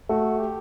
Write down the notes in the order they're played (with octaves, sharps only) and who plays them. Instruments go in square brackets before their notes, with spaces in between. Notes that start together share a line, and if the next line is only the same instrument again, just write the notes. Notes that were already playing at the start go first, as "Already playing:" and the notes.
[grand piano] A3 [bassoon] F#4
[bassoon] G4